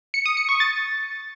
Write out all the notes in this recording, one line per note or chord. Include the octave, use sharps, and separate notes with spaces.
C#7
D#6
C#7
C#6
A6